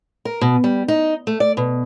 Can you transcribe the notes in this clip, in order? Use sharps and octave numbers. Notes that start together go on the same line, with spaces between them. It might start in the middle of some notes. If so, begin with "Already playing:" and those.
A#4
B2
G3
D#4
A3
D5
B2